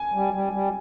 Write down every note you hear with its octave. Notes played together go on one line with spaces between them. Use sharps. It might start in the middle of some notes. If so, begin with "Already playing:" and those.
Already playing: G#5
G3
G3
G3